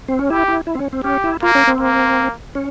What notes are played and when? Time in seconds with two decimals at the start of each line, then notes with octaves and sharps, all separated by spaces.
0.08 C4
0.19 C#4
0.30 E4 G4
0.48 E4
0.67 E4
0.75 C4
0.79 C#4
0.93 C4
1.04 C#4 G4
1.24 E4
1.43 A#3 F4
1.55 C#4
1.67 C4
1.80 A#3
2.55 C#4